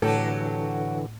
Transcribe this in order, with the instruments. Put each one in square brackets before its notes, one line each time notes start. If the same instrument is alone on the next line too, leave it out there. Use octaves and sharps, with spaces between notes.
[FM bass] A2 [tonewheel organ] D3 E3 [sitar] F#3 G4 [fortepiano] A4